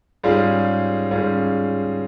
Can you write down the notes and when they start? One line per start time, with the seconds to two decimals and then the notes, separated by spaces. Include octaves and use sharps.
0.24 G#2 G3 C#4 F4 G#4
1.11 G#2 G3 C#4 F4 G#4